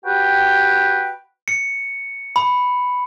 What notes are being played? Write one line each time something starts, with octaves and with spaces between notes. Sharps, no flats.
F#4 G4 B4 G5
C#7
B5